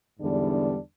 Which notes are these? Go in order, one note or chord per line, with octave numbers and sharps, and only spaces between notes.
E2 G#2 D3 G3 B3 D4